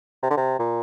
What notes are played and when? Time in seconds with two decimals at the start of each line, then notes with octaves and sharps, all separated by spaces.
0.23 C3
0.31 D3
0.37 C3
0.59 A#2